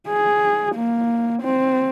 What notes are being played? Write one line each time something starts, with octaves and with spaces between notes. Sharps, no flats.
G#4
A#3
C4